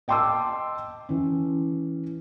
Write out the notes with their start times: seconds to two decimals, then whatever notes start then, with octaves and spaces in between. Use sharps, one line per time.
0.08 D#5 G5 A5 C6 D6 E6
1.09 E3 C#4